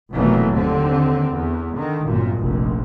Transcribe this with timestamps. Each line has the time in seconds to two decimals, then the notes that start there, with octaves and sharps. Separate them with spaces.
0.12 F1 B2 E3 F#3 A3 A#3
0.52 D#2 D3 C4
1.32 E2
1.73 D3 D#3
2.05 G1 F#2 A#2
2.38 F1 A#1